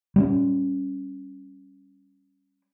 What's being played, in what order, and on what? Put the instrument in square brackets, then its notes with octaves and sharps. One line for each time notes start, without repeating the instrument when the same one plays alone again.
[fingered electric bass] G3 G#3 C#4